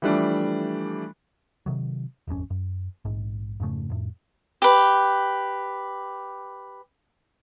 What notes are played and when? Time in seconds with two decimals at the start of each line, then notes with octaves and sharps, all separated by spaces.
0.02 E3 F3 G3 A3 D4
1.66 C3 D#3 F#3
2.28 D#1 G#1 F2 C#4
2.50 F#2
3.05 A#1 G#2
3.60 F2 G#2 C#3 A3
3.90 F2 A2
4.62 G4 B4